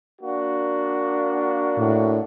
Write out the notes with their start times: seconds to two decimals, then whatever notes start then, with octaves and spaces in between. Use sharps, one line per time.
0.21 A#3 D4 F#4
1.78 A2